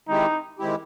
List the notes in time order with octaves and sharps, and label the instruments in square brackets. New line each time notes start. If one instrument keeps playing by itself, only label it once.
[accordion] D#3 G#3 C4 E4 G4 [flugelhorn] D#4
[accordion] D#3 G#3 C4 E4 G4